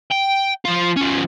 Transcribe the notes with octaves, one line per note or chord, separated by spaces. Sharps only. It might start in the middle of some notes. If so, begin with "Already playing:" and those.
G5
F3 F4
F3 C#4